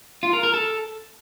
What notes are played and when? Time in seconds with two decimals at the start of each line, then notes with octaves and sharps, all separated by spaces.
0.23 F4
0.33 A#4
0.43 A#4
0.54 A4